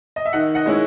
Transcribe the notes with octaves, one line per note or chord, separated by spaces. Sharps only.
D#5
E5
D#3 D#5 F#5
D#5 F#5
G#3 C#4 E4